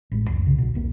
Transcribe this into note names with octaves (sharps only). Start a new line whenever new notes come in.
A1 G#3
C#2 F#2
C2 C#3
B1 B2
E1 B1 A#3